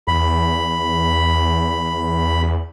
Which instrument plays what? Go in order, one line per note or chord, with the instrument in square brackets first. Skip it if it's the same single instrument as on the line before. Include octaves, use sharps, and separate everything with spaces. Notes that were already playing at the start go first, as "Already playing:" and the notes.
[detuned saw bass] E2 [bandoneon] B5